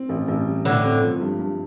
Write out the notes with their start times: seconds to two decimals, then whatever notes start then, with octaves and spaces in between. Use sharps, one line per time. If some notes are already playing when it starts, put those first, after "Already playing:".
Already playing: C4
0.09 A1
0.28 A1
0.47 G3
0.65 G1 A2 D3
0.84 C4
1.02 F3
1.21 G2
1.39 G2